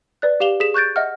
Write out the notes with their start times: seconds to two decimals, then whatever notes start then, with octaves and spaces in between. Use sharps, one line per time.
0.22 B4 D5 F#6
0.40 G4 F5 E7 F7 G7
0.60 G#4 B6 E7
0.74 C#6 F#6 G6 A6 D7
0.96 D#5 E5 F#5 F6